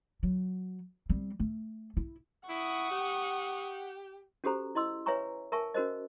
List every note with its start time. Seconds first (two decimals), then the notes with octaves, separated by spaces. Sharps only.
0.23 F#3
1.10 G3 C4
1.39 A3
1.97 E4
2.49 E4 F#5 C#6 D#6
2.91 G4
4.44 C#4 F#4 G4 A4 C5 A#5
4.75 E4 D#5 C6 E6
5.06 B4 C#5 E5 G#5 A#5 C#6
5.52 A#4 E5 G#5 A5 C#6
5.74 C#4 F#4 A#4 C5 D#5